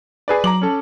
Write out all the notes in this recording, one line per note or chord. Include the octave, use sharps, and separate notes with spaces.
G#4 B4 D5
F#3 A#5 D6 F#7
C#4 A4